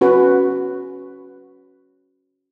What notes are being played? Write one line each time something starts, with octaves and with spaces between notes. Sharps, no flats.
C#4 F#4 B4